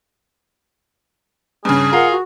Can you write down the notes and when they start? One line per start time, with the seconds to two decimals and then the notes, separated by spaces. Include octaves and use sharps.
1.65 G2 C#3 C#4 G#4
1.93 F4 A#4 F#5
2.11 F#4